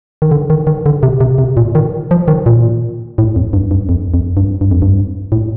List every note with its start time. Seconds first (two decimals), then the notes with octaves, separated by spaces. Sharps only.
0.22 D#3
0.31 D3
0.50 D#3
0.67 D#3
0.86 D3
1.03 C3
1.20 C3
1.38 C3
1.57 A#2
1.75 D#3
2.11 F3
2.28 D#3
2.46 A#2
3.18 A2
3.36 F2
3.53 G2
3.71 G2
3.89 F2
4.14 F2
4.37 G2
4.61 G2
4.71 F2
4.82 G2
5.32 A2